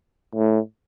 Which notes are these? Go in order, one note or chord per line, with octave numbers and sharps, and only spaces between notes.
A2